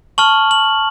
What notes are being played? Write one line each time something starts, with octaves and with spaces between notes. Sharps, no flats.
A5 C#6 F6 F#7
F#7